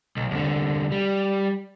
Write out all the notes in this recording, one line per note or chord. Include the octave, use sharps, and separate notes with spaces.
B1
C2 D3
G3